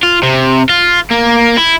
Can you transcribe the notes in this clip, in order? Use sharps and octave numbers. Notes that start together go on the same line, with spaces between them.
F4
C3
F4
A#3
E4